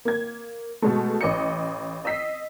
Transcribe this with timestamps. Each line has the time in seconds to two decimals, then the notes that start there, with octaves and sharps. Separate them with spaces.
0.05 A#3 G#6
0.82 B2 G#3 A3
1.21 A1 D#5 C#7
2.05 D#5 E6 B6 C7